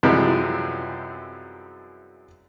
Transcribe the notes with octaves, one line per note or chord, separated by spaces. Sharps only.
F#2 C3 E3 F3 G3 G#3